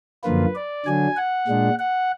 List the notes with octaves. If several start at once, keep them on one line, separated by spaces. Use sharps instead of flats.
F#2 D3 F3 A#3 F4 B4
D5
D3 F#3 D4 G#5
F#5
A#2 G#3 D4
F#5